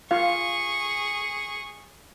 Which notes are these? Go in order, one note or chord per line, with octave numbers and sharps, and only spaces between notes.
F4 G#4 F5 C#6